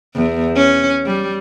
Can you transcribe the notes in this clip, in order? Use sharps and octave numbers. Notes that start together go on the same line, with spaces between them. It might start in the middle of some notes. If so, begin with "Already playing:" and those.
E2
C#4
G3